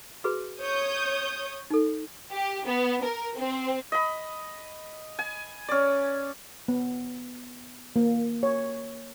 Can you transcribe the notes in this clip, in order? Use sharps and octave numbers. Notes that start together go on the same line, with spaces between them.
F#4 G#4 B4
C#5 D#6 G6
D#4 A4
G4
B3
A#4
C4
D#5 B5
G#5
C#4 D5
B3
A#3
C#5